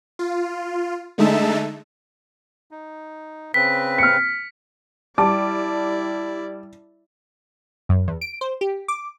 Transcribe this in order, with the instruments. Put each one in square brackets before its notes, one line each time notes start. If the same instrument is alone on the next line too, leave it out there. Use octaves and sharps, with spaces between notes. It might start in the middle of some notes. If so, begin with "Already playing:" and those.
[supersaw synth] F4
D3 G#3 A3 D#4 E5 A5
[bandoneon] D#4
[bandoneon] C#3 C4 B4 [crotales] B6
[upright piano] F6 C#7
[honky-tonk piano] G3 D6 [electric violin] E4 D5 [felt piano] A5
[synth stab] F#2
E2
D7
C5
G4
D6